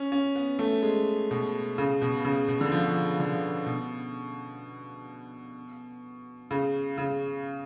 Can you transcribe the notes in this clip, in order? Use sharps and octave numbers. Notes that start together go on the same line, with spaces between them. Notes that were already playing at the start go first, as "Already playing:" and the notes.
Already playing: C#4
C#4
B3
A3
G#3
B2
C#3
B2
C#3
B2
D3
F3
D3
B2
C#3
C#3